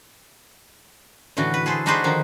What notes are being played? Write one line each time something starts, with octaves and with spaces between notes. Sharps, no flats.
A2 D3 E3 F#4
B4
G#4 A4 B4 C5
D4 D#4 F#4 G#4 B4 C5
D3 D#3 F3 D#4